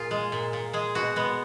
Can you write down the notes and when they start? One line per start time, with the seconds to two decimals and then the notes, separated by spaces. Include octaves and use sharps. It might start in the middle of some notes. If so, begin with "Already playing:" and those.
Already playing: A#2 F4 G#4
0.11 G#3
0.32 A#2
0.53 A#2
0.73 G#3 G#4
0.95 B2 F#4
1.16 G#3 B3